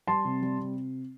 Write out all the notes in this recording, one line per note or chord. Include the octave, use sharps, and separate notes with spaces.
G3 A5 C6
C3
G3
C3